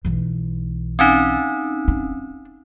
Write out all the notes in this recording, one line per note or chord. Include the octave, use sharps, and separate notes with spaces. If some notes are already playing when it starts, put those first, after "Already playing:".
B1 E3
C4 C#4 D#4
D4